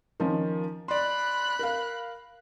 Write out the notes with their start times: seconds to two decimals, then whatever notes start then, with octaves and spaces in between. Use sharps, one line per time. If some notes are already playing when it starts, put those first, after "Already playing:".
0.20 D#3 F3 C#4
0.88 D5 B5 C6 F#6
1.59 A#4 F5